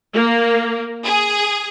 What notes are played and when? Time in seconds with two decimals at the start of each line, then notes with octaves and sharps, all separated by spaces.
0.14 A#3
1.04 G#4